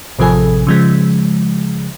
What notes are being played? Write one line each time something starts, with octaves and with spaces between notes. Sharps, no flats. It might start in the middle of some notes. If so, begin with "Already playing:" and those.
A1 C3 F3 A4 G#5
C#3 F3 G#3